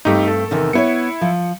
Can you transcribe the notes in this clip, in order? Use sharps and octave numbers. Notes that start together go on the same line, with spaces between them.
G2 A3 C4 D#4 G4
A4
E2 C3 D#3
B3 E4 C5 C#5 C#7
F3